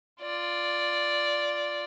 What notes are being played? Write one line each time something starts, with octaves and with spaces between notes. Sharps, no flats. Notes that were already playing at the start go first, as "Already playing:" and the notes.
F4 D5